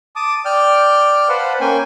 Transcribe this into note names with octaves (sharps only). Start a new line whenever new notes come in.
A5 D6 D#6
D5 G5 F6 G6
B4 C5 F5 F#5 A5
A#3 C#4 G5 G#5